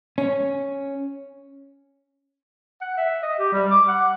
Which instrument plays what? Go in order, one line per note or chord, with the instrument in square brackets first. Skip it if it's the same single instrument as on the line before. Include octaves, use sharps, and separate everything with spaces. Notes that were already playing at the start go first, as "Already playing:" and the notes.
[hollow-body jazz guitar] C#4
[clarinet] F#5
E5
D#5
G4
G3
D6
F#5